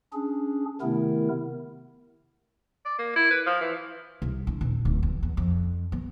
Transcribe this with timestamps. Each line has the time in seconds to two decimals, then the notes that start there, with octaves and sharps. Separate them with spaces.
0.13 C#4 D4 G#4
0.81 C3 D#3 A3 B3 E4 A#4
2.86 D5
2.99 A#3
3.16 E4
3.31 B4
3.46 F3
3.61 E3
4.22 C2
4.47 D3
4.61 D#1
4.85 D1
5.03 E2
5.23 E2
5.37 F2
5.92 B3